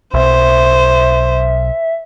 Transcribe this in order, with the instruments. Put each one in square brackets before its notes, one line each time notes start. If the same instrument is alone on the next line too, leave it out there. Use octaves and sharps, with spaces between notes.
[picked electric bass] B1 [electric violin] C5 [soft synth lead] E5